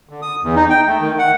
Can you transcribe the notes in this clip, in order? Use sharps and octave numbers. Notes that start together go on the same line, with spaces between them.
D3
D#6
E2
D#4
G5
A3
D#3
F#5